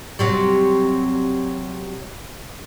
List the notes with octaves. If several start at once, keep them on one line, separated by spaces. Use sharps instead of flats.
C3 F#3 G3